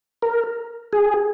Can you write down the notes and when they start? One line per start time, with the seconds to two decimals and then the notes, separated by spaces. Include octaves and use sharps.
0.22 A#4
0.93 G#4